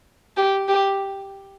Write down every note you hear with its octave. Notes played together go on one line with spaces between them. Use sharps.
G4
G4